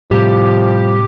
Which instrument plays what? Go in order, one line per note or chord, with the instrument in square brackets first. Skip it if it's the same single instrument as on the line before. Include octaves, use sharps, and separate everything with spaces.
[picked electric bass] A2 C3 [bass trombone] F3 [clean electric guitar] G3 [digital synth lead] G4